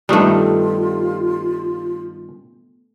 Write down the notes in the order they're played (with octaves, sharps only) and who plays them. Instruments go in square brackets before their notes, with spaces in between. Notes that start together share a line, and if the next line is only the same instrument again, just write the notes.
[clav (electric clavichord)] G2 D#3 G3 [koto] A3 B3 [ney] F4